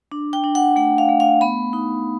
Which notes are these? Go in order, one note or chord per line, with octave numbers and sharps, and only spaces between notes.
D4
G5
D4
F#5
A3 F#5
F5
A3
F5
B3 B5
D#4